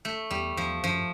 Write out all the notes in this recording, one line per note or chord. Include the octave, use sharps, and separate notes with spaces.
A3
E2 G3
E2 F3
F#2 F3